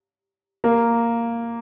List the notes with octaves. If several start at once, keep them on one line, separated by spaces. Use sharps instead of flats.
A#3